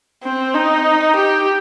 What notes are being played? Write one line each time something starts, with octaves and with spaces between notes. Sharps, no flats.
C4
D#4
G4